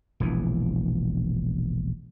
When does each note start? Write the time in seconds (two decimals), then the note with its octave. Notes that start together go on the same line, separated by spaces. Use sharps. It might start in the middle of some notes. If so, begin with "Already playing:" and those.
0.20 E1 A#1 E2 E3